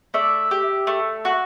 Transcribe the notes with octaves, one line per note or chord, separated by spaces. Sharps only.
A3 D5 E5
G4
A3
F#4